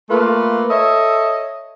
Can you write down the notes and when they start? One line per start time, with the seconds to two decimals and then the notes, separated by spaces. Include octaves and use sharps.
0.09 A3 A#3 F4 A4 B4
0.70 A4 C#5 D#5 E5